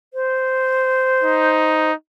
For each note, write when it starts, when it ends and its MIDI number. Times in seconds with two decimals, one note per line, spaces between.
0.14 1.91 72
1.23 1.93 63